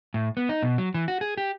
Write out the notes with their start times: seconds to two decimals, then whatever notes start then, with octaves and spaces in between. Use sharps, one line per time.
0.14 A2
0.37 B3
0.49 D#4
0.63 B2
0.78 F#3
0.94 E3
1.08 F#4
1.21 G#4
1.38 G4